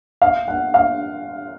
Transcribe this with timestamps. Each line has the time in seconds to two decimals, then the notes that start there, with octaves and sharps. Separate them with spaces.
0.22 F5
0.48 F#5
0.74 F5